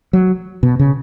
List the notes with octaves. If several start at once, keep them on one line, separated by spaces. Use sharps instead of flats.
F#3
B2
C#3